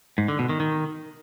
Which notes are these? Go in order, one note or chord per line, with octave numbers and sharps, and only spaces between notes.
G#2
D3
B2
D#3
D#3